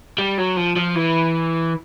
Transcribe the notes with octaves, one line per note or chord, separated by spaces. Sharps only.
G3
F#3
F3
F3
E3